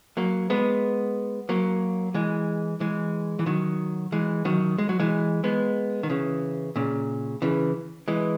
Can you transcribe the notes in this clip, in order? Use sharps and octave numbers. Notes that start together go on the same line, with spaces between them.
F#3 A#3
G#3 B3
F#3 A#3
E3 G#3
E3 G#3
E3
D#3 F#3
E3 G#3
D#3 F#3
G#3
F#3
E3 G#3
G#3 B3
D#3
C#3 E3
A#2 C#3
C#3 E3
E3 G#3